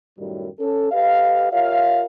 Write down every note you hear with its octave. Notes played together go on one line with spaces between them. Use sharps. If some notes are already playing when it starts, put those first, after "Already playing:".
F#2 A2 D#3 F#3 G3
C#4 A4
G4 A4 B4 D#5 F5
F4 G4 A#4 C#5 E5 F5